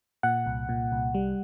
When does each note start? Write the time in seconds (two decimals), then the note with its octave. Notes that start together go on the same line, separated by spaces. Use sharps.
0.23 A#2 F#5
0.46 C2
0.69 A#2
0.92 C2
1.14 G3